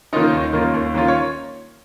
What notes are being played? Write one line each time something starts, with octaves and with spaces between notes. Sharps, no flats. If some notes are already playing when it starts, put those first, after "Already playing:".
D#3 A#3 C#4 D#4 F4 D#5
D#2
D#3 A#3 C#4 F4
D#2
D#3 A#3 C#4 F4
C#5